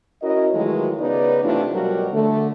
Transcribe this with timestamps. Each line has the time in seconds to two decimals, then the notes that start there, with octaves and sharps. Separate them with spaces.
0.22 C#4 E4 F#4 A#4 D#5
0.53 D#3 E3 F#3 G#3 A3 F4
0.99 C#3 B3 D#4 B4 D5
1.43 C3 E3 A3 D4 F4
1.72 B2 F#3 G3 F#4 A#4
2.12 D3 A3